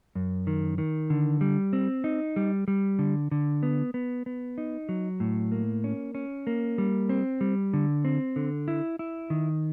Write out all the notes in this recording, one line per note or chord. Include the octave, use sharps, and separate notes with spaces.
F#2
D#3
D#3
D3
G3
C4
D#4
G3
G3
D3
D3
B3
B3
B3
D#4
F#3
A2
A#3
C#4
C#4
A#3
G3
C4
G3
D3
C4
D3
E4
E4
D#3